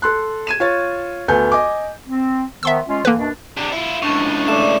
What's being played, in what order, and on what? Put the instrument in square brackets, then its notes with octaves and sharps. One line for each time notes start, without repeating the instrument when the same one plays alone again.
[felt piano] A4 C6 F#6
G#6 D#7 E7
F4 C#5 A6
D2 B3 A4 G#5 G6
D#5 G#5 D6
[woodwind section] C4
[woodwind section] D#3 F3 B3 [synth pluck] E5 C6 E6
[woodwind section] G#3 C#4 F4
[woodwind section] D3 E3 [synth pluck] A#3 B4
[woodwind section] F#2 B2 D4
[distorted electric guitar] C3 D4
E4 F4
[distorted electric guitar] C#2 A2 [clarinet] D4 [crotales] C#6
[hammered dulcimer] A3 D5 [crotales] E7